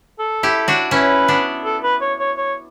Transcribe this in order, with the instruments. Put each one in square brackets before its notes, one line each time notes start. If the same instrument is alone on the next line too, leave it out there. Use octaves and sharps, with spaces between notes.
[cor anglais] A4
[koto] E4 G4
D4 F#4
[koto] C#4 E4 [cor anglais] B4
[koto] B3 D4
[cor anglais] A4
B4
C#5
C#5
C#5